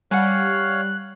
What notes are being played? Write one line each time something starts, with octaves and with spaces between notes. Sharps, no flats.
G3 C#5 F5 F#5 G#5 F#6